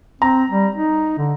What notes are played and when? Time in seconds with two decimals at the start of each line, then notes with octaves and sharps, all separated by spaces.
0.22 C4 A#5
0.50 G3
0.75 D#4
1.18 D3